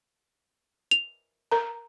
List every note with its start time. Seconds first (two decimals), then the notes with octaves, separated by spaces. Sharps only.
0.91 F7
1.52 A#4 A#5